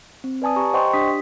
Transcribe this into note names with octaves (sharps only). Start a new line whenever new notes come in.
C4
B4 D5 G#5 A5 D#6
G4 A#5 C#6
C5 D#5 F#5 G5 C6 C#6
D4 G4 D#6 B6